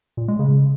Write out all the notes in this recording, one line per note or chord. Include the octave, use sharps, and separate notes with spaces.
A#2
G#3
C#3